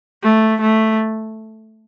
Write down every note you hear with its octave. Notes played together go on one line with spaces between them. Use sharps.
A3
A3